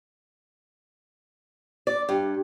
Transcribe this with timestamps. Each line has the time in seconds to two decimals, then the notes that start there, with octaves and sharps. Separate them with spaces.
1.87 D5
2.09 G2